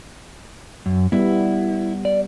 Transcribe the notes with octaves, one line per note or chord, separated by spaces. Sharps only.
F#2
G3 B3 E4
D5